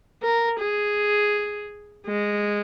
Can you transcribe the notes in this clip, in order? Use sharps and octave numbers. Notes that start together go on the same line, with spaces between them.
A#4
G#4
G#3